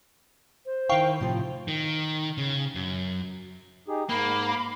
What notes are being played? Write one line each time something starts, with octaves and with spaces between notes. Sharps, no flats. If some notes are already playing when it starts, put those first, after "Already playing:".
C5
D#3 E4 F5 G5 C#6
A2 C3 F3
D#3
C#3
F#2
D#4 G4 G#4
G#2 A#3 B5